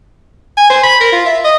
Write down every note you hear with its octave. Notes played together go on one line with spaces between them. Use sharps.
G#5
C5
B5
A#4
F4
E5
D#5